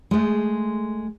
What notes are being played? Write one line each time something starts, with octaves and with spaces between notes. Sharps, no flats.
G#3 A3